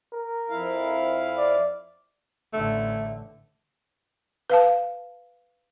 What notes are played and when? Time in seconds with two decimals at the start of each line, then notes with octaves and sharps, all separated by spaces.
0.13 A#4
0.50 F2 E4 F5
1.37 D5
2.54 A1 D3 A3
4.50 B4 F5 A5